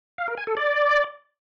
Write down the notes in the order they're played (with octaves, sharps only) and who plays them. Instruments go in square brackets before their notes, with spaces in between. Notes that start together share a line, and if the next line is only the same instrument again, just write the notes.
[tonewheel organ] F5
A#4
G#5
A4
D5